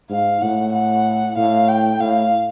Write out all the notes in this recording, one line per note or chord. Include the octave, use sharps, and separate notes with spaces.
G#2 F5
A2 F#5
F#5
A2 F5
G5
A2 F5